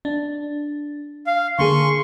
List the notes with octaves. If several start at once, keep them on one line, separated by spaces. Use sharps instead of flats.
D4
F5
D3 A#3 G#4 C6 C#6